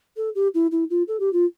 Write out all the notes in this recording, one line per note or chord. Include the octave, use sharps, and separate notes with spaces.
A4
G4
E4
E4
F4
A4
G4
F4